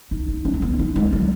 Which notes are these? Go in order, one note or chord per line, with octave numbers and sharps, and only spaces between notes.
D#4
D#4
C#4
A3
B3
D#4
G#3
F#3